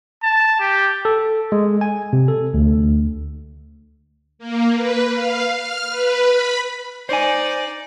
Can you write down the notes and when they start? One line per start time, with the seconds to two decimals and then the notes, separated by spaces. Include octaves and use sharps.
0.23 A5
0.60 G4
1.05 A4
1.52 G#3
1.81 G#5
2.13 C3
2.28 A4
2.54 D2
4.39 A#3
4.76 B4
5.13 F5
5.53 F6
5.89 B4
6.25 B5
7.09 D#4 C5 D5 G#5